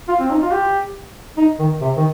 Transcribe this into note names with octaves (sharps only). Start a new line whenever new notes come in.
F4
C4
D#4
F4
G4
D#4
D#3
C3
D#3